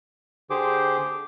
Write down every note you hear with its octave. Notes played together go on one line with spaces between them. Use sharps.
D3 G4 G#4 C5 D6